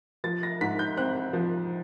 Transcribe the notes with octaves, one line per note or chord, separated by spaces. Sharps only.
F3 A6
A#6
G#2 B6
G6
C4 F#6
F3